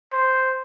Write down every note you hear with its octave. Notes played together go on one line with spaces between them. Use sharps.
C5